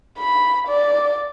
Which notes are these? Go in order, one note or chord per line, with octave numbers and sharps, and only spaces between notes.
B5
D5